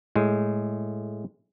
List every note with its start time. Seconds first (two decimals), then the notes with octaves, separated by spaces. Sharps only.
0.16 A2 G#3